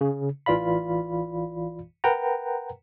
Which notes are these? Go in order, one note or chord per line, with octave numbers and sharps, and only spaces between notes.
C#3
A1 E3 F4 D5 F5 B5
A#4 B4 F#5 G5 A#5